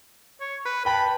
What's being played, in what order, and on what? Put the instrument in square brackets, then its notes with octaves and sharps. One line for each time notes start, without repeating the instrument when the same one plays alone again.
[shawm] C#5
B4
[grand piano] B4 G5 A5 [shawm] B5